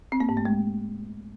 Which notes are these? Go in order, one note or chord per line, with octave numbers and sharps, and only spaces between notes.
C4
A#3
G#2
A3
G#3